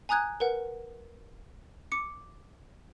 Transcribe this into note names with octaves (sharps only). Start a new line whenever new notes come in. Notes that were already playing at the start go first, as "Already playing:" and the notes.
G#5 A#5 D#6 F#6 G#6
A#4 B4 F#5
D6 C#7